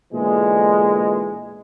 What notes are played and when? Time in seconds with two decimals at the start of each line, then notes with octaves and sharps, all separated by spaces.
0.14 B1 A#2 D3 E3 G#3